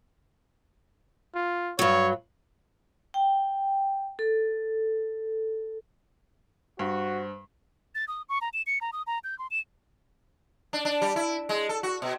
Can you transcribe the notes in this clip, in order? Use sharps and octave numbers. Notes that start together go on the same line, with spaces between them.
F4
G2 F#3 C#5
G5
A4
G2 F#4 C5
A6
D#6
C#6
A#5
E7
C#7
A#5
D#6
A#5
G6
C6
E7
D4
D4
G3
E4
G#3
A4
F#4
B2